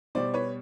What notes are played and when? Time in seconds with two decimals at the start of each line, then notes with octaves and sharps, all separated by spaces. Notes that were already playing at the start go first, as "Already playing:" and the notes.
0.15 B2 G3 C5 D5
0.34 B4 C#5